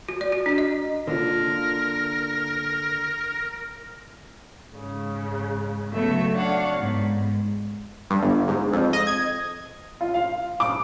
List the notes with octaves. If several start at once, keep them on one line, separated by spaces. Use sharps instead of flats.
F#4
D5
F#4
D4
D#5
D3 A#3 F4 A#4
G#2 C#3
C#3 F#3 A3 B3 E5
D4 C#5 F5 F#5
G#2 B3
G2
G1
G#2
F2
D#5
G#6
F4
F5
D6